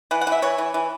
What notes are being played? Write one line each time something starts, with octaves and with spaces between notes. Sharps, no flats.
E3 F#5
F#5
E3
E5
E3 C#5
E3
E3